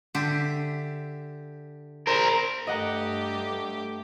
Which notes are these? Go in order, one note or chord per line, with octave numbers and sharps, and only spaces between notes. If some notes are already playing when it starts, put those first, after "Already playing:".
D3 G4 E5
A#4 C5
G2 A3 G4 D#5 F#5 A#5